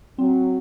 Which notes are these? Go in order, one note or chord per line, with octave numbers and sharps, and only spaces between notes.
F#3 C4